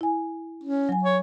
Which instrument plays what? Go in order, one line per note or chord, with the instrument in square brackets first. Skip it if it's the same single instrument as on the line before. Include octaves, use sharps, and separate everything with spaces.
[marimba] E4 G#5
[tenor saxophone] C#4
[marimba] F#3 G#5
[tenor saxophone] C#5